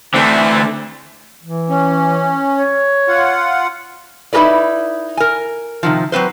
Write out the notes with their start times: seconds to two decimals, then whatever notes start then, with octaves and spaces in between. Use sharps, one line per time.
0.14 D3 E3 A3 C4
1.43 E3
1.69 C#4
2.53 C#5
3.08 F4 F#5
4.33 D#4 E4 G#4 A#4 B4 D5
5.17 A#4 G#5
5.83 C3 D#3 F3
6.12 F#3 C4 B4 C5